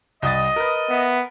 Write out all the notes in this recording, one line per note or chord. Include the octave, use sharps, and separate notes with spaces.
C2 D#5 D#6 A6
A#4 B4
B3 E5